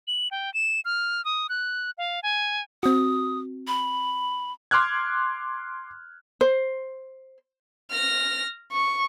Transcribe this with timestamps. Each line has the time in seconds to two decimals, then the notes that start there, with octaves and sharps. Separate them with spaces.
0.07 F#7
0.31 G5
0.54 E7
0.85 F6
1.25 D#6
1.49 F#6
1.98 F5
2.23 G#5
2.83 C4 F#4 D#6
3.67 B5
4.71 C6 D6 F6 F#6 G#6
6.41 C5
7.91 F6 A#6
8.72 C#6